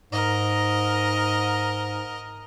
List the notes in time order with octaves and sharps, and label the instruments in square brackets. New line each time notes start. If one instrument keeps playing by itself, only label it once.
[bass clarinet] G#2 [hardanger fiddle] A#4 D#5